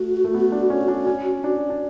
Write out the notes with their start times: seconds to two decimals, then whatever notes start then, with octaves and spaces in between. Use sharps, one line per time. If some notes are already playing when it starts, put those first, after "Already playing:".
Already playing: A3 F#4
0.24 A3
0.34 B3
0.52 D4
0.70 C#4
0.88 D4
1.07 C#4
1.44 D4
1.70 D4